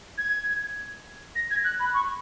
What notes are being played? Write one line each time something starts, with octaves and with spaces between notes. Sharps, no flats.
G#6
A#6
G#6
F#6
B5
C#6